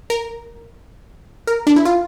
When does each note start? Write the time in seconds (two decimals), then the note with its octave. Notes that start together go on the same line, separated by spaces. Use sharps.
0.10 A#4
1.47 A#4
1.67 D4
1.76 E4
1.85 F4